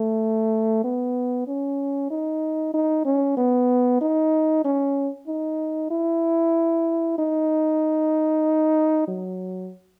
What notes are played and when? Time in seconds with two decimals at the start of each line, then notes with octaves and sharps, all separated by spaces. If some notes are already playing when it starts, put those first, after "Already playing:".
Already playing: A3
0.84 B3
1.47 C#4
2.11 D#4
2.74 D#4
3.05 C#4
3.37 B3
4.01 D#4
4.64 C#4
5.27 D#4
5.91 E4
7.18 D#4
9.08 F#3